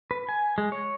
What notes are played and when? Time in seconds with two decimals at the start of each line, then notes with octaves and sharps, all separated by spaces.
0.11 B4
0.29 G#5
0.58 G#3
0.72 C#5